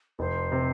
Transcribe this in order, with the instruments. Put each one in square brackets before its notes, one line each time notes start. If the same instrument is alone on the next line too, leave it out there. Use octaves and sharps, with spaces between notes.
[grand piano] F1 [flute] C5
[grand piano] C3